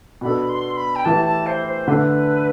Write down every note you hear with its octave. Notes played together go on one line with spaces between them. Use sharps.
B2 B3 D4 A4 B5
C6
B5
G5
A2 E3 A3 E4 G4 A5
A5
C5
C5
D3 A3 D4 A4 B4